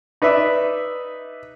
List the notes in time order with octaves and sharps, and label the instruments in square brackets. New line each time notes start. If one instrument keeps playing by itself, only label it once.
[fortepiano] D#4 B4 D5 E5